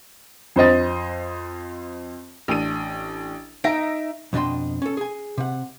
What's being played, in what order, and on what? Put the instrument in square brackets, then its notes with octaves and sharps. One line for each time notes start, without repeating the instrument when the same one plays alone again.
[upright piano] F2 C5 D#5 A6
[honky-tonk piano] A1 D4 D#7
[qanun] D#4 [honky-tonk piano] E5 A#6 D7
[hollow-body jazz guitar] F2 B2 D4 D#5 G5 C6
C#4 A4
G#4 G#5
C3 F#5